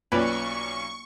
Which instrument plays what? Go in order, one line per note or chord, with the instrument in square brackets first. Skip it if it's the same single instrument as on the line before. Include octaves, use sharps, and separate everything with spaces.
[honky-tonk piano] B1 C#4 D5 [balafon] A#3 F4 [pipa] B4 [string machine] C#6